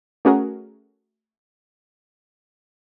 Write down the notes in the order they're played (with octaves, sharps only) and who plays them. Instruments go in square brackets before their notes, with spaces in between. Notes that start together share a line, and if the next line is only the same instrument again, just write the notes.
[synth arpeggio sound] A3 C#4 F#4 G#4 A#4